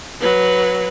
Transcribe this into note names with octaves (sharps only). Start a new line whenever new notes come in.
F#3 B4